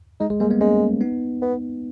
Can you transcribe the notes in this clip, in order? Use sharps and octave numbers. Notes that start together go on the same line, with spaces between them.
G#3 D#4
G#3
G3 G#3 A#3
G#3 B3
G#3 A#3 C#4
B3 D#4
B3